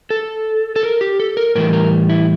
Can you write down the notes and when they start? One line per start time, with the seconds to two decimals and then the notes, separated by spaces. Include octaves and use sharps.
0.10 A4
0.76 A4
0.83 A#4
1.01 G4
1.20 A4
1.37 A#4
1.55 A2 E3 G3 A#4
1.73 A#4
2.10 E4